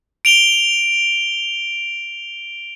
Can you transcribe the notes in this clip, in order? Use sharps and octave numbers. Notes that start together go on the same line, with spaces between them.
D7 F7 G7